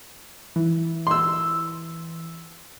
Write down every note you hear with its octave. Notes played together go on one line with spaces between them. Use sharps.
E3
C6 E6